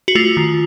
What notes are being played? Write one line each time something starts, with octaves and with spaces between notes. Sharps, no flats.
F#4
A3 F4
D#3